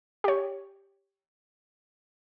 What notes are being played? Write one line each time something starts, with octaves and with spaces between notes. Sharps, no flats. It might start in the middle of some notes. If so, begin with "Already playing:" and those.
G4 C#5